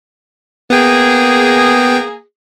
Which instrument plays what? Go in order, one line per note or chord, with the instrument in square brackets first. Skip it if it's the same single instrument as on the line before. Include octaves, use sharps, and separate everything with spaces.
[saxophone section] A#3 G#4 [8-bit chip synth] B3 G5